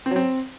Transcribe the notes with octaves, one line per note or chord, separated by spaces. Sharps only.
C4
F#3
C4